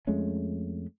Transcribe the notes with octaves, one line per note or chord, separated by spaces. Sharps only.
F2 G#3 A3 C#4